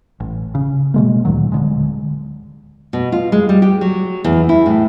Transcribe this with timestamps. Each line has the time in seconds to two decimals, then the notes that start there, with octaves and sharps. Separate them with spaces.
0.20 A1
0.55 C#3
0.94 B2 G#3 A#3
1.25 D2 A#2 D#3 F#3
1.52 D1 D3 G#3
2.93 B2
3.12 F4
3.32 G#3
3.49 G3
3.62 G4
3.81 F#3
4.24 E2
4.49 E4
4.66 A2